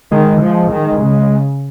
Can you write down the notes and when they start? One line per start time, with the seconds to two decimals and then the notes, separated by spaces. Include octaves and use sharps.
0.11 D#3 G#3
0.41 F3
0.71 D#3
1.01 C#3